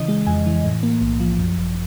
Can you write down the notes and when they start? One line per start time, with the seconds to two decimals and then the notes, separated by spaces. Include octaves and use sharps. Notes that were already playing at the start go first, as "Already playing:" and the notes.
Already playing: C#3 E3 D#5
0.08 G#3
0.27 F2 G#5
0.46 E3
0.65 A2
0.83 A#3
1.01 B1
1.20 F3
1.39 F#2
1.58 G#1